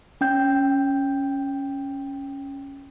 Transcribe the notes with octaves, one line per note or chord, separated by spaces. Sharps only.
C#4 G5 G6